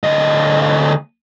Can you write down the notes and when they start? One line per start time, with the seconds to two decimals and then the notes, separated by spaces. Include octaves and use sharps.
0.03 D2 D#5